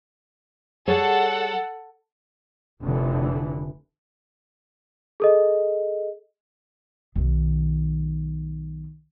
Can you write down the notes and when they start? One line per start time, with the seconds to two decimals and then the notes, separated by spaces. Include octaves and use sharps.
0.87 G3 G#4 A4 C#5 F#5
2.83 F1 D3 E3
5.20 G#4 A4 D#5
7.15 B1 D#3